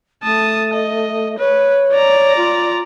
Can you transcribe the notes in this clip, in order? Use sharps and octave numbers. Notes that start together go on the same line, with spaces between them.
A3 A5 D#6
D#5
B4 C#5
D5 A#5
F4